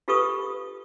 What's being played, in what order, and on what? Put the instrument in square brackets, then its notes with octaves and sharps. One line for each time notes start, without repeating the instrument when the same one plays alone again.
[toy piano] F4 G4 A4 B4 C#6 D#6